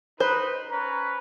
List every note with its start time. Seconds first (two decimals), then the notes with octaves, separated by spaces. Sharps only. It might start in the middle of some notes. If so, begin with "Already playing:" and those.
0.20 D#4 B4 C5
0.71 C#4 B4 A#5